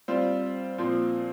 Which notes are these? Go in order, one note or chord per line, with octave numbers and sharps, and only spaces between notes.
G3 C4 F4
A#2 F3 C4